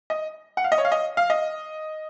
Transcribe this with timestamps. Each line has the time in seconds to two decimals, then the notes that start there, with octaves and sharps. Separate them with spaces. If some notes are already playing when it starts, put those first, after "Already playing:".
0.10 D#5
0.57 F#5
0.64 F5
0.72 D#5
0.78 C#5
0.85 F5
0.92 D#5
1.17 F5
1.30 D#5